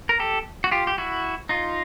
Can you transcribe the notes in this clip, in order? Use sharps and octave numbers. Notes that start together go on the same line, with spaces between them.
A#4
G4 A4
F#4
F4 G4
G4
E4 F#4
D#4 F4